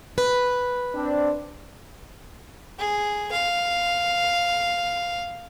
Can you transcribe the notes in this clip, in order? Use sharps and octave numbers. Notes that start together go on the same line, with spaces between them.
B4
C4 D4
G#4
F5